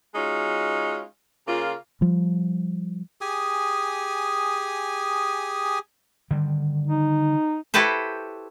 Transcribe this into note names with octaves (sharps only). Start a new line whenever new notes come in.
G#3 C#4 D#4 F4 F#4
C#3 A#3 F4
F3 G3
G4 G#4 G#5 D#6
D3 D#3 G3
D#4
E4 F#4 G4 A4 B4 C5